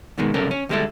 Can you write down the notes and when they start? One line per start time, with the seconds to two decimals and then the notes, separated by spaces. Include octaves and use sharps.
0.18 G#2 B2 D#3 G#3
0.34 C2 F#2 C#3 C#4 A4 A#4
0.51 C#4
0.69 D2 G3 G#3 D4 E4 A4